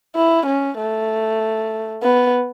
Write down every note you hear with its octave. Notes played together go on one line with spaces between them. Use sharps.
E4
C#4
A3
B3